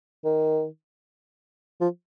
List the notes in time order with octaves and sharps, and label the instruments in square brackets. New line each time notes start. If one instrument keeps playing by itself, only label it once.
[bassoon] D#3
F3